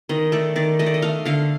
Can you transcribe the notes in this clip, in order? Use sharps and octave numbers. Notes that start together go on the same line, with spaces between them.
D#3 D#5
A3 D5
D#3 D5
A3 D#5
D5
D#5
A3 F5
D3 F5